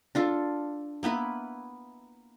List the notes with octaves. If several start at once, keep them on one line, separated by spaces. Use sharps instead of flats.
D4 F4 A4
A#3 B3 E4 B4